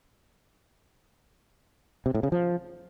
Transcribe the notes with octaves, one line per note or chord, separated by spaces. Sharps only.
C3
A2
C#3
F3